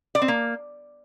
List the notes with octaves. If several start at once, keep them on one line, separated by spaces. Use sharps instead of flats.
D5
C4
A#3